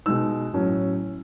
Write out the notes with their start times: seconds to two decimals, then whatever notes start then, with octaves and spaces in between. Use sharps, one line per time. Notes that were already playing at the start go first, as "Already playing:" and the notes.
0.06 B2 G#3 D#4 E6
0.53 A2 F#3 C#4